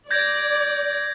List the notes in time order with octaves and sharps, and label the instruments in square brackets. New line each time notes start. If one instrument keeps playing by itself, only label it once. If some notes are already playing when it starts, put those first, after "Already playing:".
[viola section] D5 [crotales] G6 G#6 A#6